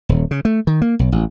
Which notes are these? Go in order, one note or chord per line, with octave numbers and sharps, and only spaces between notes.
D#1
C#3
A3
D#3
A#3
B1
A1